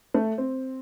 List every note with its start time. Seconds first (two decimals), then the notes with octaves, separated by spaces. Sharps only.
0.14 A3
0.38 C4